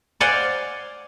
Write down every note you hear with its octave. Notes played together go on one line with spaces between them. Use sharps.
C5 D5 F5 F#5 G#5 C6